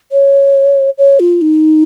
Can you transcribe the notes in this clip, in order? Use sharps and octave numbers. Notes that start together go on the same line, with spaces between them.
C#5
C#5
F4
D#4